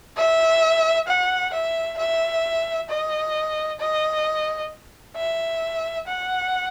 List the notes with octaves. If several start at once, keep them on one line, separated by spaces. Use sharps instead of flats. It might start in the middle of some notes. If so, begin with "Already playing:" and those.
E5
F#5
E5
E5
D#5
D#5
E5
F#5